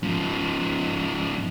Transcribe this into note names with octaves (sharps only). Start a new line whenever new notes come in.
G#2 F3